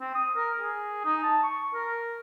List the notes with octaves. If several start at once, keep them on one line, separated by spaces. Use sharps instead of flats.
C4
D#6
A#4
G#4
D#4
A5
C#6
A#4